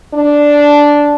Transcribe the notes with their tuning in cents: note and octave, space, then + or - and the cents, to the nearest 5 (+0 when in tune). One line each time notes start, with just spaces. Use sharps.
D4 -5